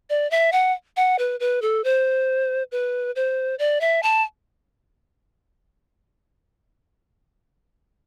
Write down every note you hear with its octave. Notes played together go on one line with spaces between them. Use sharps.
D5
E5
F#5
F#5
B4
B4
A4
C5
B4
C5
D5
E5
A5